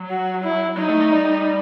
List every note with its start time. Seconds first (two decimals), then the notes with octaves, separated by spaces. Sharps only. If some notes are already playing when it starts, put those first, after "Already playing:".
Already playing: F#3
0.11 F#4
0.44 E4
0.77 F#3 D#4
0.89 A3
1.00 A3
1.11 G3